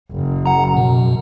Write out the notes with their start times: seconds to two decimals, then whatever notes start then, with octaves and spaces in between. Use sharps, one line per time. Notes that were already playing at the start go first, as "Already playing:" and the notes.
0.13 F#1
0.46 F#5 A#5
0.77 F#2 B2